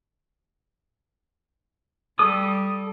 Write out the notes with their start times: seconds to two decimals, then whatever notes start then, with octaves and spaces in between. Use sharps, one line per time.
2.19 G3 A4 D#6